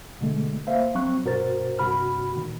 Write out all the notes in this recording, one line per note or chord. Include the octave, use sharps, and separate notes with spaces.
B2 D3 G#3 A3
A#3 C5 E5 F5
F#3 C4 C#6 F#6
G2 B2 F#4 A#4 C5 A6
G2 C3 F#4 B5 F6
A#2 D#3